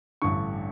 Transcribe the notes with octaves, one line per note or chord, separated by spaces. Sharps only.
A1 G2 D3 C#6